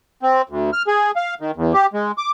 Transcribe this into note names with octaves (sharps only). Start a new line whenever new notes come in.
C4
D2
F6
G#4
F5
D#3
E2
G4
G#3
D6